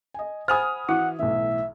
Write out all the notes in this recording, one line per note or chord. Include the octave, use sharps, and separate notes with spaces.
D#5 G#5
C5 F#5 G#5 B5 D#6 F6 G#6
E3 E4 F#4 F#5
B1 A2 E3 E5